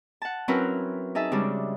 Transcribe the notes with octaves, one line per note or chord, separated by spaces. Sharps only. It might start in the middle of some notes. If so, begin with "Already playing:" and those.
F#5 A5
F#3 C4 C#4 E4 A#4 B4
D#4 G#4 E5 A5
C#3 G3 G#3 C4 D4